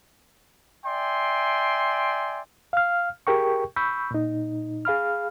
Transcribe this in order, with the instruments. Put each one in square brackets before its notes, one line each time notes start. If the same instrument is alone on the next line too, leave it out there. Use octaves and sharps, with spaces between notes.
[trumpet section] D5 E5 G5 G#5 C6
[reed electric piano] F5 F6
G4 G#4 A#4 G5 C#6
B5 C#6 E6 G6
A#2 D#4
G#4 F5 B5 F6